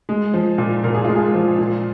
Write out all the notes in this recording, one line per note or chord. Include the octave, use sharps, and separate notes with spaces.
G#3
F3
A#2
A#2 A#4
G#4
G#3 F4
G#4
F3
A#2